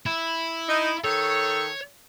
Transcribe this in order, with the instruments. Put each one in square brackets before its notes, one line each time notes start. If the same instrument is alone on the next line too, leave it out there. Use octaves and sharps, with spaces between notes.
[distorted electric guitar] E4
[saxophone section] D#4
[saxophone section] D#3 A4 [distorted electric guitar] C#5